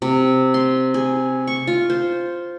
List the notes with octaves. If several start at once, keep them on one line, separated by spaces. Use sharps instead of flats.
C3
C6
G#4
C#6
F4
C5